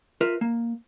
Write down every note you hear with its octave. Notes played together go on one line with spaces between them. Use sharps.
F4 A#4 B4 E5
A#3